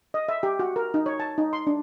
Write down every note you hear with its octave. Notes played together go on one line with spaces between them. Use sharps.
D#5
E5
G4
F#4
A#4
D#4
C#5
A5
D#4
C6
D4